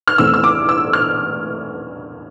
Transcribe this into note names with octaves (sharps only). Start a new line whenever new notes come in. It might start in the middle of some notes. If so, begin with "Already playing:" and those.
F6
E2 E3 A3 C4 E6
E6
D6
E6
F6